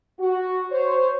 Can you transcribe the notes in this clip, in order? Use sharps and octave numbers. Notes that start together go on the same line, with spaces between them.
F#4
C5 C#5